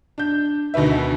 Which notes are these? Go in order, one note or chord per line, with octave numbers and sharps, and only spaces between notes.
D4 G6
D2 B2 D#3 B4 E5